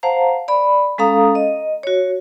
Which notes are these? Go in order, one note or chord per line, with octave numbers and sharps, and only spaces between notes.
C5 F5 F#5 A5 A#5
D5 B5
G#3 C#4 A4 F5 A#5 D#6
D#5
F#4 C#5